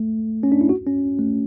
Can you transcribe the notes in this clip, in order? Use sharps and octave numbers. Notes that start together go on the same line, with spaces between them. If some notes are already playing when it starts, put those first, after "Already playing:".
Already playing: A3
C#4
D4
E4
F#4
C#4
A3